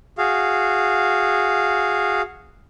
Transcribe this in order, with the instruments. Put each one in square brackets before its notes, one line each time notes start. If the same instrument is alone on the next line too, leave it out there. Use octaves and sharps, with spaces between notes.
[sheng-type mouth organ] F#4 G#4 F5